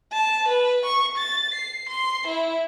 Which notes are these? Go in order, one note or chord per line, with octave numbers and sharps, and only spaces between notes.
A5
B4
C#6
A6
C7
C6
E4